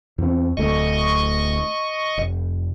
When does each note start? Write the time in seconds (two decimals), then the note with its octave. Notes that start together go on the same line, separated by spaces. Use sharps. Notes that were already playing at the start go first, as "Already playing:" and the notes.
0.18 E2 C4
0.57 D1 D2 A3 D#5 C#6
2.17 F1